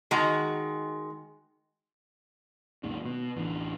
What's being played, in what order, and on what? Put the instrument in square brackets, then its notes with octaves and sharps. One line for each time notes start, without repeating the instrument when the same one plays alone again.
[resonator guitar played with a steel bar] D#3 G#3 F#4 A#5
[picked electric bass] F#1 D#2 G#2 C#3
B2
A1 D2 E3